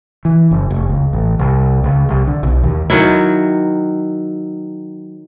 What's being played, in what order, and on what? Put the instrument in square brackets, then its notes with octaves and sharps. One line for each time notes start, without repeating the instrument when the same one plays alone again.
[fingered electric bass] E3
F#1
F1
C#2
A1
C2
C#2
C2
D3
B1
D#2
[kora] D#3 F#3 E4